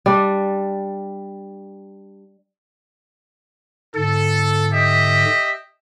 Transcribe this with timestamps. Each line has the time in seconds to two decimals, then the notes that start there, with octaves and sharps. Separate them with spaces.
0.06 G3 D4
3.96 G#2 D3 A4
4.73 G4 D#5 E5